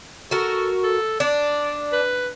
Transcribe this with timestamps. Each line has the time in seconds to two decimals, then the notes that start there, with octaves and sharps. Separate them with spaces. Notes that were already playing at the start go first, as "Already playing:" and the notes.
0.31 F#4 A4 A#4
0.84 A4
1.20 D4 D5
1.92 B4